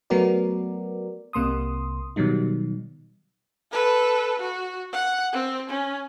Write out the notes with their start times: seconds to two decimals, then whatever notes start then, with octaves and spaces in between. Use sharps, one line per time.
0.10 F#3 A3 B3 F#4 A#4 D5
1.33 C2 C3 A#3 C6 D#6
2.16 B2 D#3 F#3 G3 D#4
3.72 A4 B4
4.39 F#4
4.93 F#5
5.33 C4
5.69 C#4